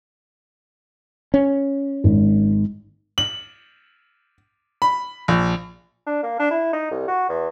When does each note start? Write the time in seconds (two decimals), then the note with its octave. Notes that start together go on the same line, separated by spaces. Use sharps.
1.34 C#4
2.04 G#1
3.18 F#7
4.82 B5
5.28 A#1
6.06 D4
6.23 A#3
6.39 D4
6.51 E4
6.73 D#4
6.91 C2
7.08 F#4
7.29 E2